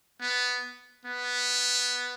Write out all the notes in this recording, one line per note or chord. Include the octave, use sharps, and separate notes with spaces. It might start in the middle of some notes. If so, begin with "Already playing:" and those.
B3
B3